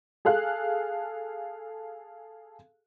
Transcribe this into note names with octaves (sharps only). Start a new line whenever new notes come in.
G#4 A4 F5 F#6